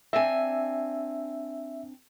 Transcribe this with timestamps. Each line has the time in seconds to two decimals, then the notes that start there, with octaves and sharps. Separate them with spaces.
0.13 C4 D4 E5 G#5